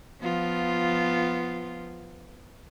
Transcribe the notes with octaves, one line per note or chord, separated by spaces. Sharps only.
F3 B3 F4